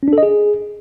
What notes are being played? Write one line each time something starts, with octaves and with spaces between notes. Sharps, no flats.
C#4
D4
A4
D#5
G#4